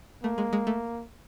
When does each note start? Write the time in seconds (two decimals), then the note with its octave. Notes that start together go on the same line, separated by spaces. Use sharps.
0.24 A3 A#3
0.38 G#3
0.53 G#3
0.67 A3